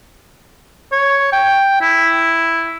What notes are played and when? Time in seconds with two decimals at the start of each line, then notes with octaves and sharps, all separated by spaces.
0.92 C#5
1.32 G5
1.81 E4